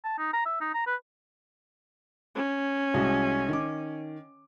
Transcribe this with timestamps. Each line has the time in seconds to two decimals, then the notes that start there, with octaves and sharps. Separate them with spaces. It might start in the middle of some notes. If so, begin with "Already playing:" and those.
0.04 A5
0.18 D#4
0.33 A#5
0.46 E5
0.61 D#4
0.74 A#5
0.87 B4
2.35 C#4
2.94 C2 G#3 F#4
3.49 D#3 D6